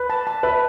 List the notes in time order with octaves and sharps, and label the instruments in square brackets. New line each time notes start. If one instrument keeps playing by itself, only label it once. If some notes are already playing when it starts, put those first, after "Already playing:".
Already playing: [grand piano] B4
[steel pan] A5
A5
[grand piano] B4 [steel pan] E5